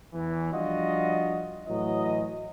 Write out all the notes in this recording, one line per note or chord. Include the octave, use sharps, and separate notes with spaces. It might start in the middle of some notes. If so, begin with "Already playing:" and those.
E2 E3
F3 G3 D4 F4 F#4 D#5
A2 E3 F#3 D#5